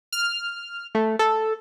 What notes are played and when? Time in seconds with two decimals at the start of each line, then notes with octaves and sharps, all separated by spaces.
0.13 F6
0.95 A3
1.19 A4